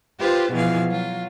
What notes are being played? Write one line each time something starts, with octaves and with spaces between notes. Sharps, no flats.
F4 G4 B4 C5
B2 E3 F3 G#4 F5
F#3 F4